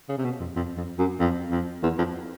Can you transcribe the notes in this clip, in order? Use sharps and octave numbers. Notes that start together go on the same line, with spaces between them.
C#3
C3
B2
F2
F2
F2
F#2
F2
F2
E2
F2